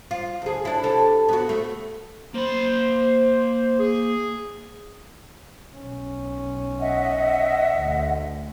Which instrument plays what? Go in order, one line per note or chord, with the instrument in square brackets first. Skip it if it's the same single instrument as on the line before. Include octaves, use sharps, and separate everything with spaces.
[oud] F4
D2 G#4
D4 E4
C3 A4
B3 F#4
A3
[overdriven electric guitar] A#3 B5 [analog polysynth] C5
[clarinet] G#4
[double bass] B1 C#4
[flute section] D#5 E5 F#5
[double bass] D2